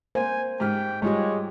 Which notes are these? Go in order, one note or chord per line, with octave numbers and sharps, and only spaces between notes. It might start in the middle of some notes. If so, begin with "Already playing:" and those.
A#3 C5 G#5
G#2 G4 G5 F6
G#2 G3 G#3 F4 G4 C#5